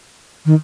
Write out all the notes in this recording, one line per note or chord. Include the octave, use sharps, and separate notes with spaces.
D#3